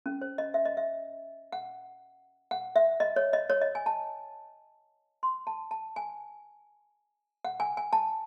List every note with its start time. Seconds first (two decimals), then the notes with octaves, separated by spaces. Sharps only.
0.06 C#4
0.21 C5
0.38 D#5
0.54 E5
0.66 D#5
0.77 E5
1.52 F#5
2.51 F#5
2.76 E5
3.00 D#5
3.16 C#5
3.33 D#5
3.50 C#5
3.62 D#5
3.75 G#5
3.86 A5
5.23 C6
5.47 A5
5.71 A5
5.96 G#5
7.45 F#5
7.60 G#5
7.77 G#5
7.93 A5